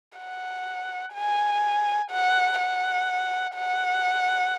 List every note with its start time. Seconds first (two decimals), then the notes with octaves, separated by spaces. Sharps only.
0.18 F#5
1.15 G#5
2.11 F#5
2.60 F#5
3.56 F#5